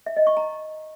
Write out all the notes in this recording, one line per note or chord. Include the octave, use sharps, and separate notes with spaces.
E5
D#5
C#6
A#5